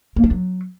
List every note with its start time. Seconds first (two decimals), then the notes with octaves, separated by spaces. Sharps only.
0.16 A#3
0.24 D4
0.31 F#3